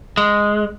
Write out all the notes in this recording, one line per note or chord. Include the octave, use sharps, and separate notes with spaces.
G#3